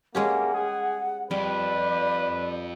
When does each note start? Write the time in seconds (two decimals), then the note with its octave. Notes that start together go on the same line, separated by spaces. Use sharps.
0.15 G#3 A#3 C#4 G4 F#5
0.54 G#4
1.31 F2 G3 B4 D5